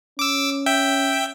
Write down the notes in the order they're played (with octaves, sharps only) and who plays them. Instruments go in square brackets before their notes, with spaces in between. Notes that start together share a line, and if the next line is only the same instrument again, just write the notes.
[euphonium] C#4 [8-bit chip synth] D6 E6
[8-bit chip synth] E5 G5